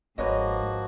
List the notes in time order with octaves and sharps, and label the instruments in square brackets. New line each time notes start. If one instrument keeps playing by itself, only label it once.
[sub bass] G1 [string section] G#2 [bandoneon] F3 A#3 F#4 [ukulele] B4 C#5 D#5